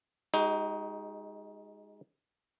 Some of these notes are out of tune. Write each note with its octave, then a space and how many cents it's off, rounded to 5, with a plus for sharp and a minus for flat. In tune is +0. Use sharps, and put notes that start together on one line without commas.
G#3 -10 D#4 +20 F#4 +45